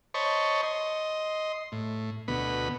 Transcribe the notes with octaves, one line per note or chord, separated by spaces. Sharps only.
C5 C#5 D#5 A5 B5 C#6
D#5 C6
A2
D2 B2 B3 B5